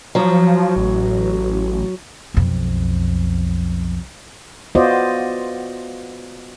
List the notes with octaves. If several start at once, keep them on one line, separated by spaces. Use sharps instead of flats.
F3 F#3
A1
B1 F2
B3 F4 F#4 C5 D5 D#5